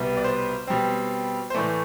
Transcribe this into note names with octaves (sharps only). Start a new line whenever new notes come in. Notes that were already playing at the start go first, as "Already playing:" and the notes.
Already playing: C2 B2 G3 B3
D5
C5
B2 G3 C4
C5
A2 E3 A3 D5